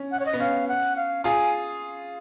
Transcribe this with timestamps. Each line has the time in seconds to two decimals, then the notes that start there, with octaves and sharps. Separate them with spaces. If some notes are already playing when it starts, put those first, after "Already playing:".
Already playing: C#4
0.12 F#5
0.20 C#5
0.26 D#5
0.33 B3
0.40 C#4 F5
0.68 F#5
0.96 F5
1.24 F4 G#4 G#5